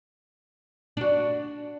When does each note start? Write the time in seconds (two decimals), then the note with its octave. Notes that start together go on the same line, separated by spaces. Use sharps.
0.97 D4 F#4